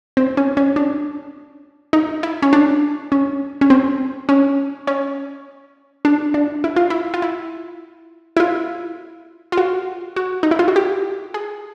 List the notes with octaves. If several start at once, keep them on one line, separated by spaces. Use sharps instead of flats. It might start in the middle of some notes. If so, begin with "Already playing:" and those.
C4
C#4
C#4
D4
D#4
E4
C#4
D4
C#4
C#4
C4
C#4
C#4
D4
D4
E4
F4
E4
F4
E4
E4
F4
F4
F#4
F#4
D#4
E4
F4
F#4
G4
G#4